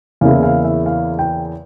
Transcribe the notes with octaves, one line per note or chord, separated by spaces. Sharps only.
E2 C#3 E3 A#3 E4 F5
F5
E5
F5
G5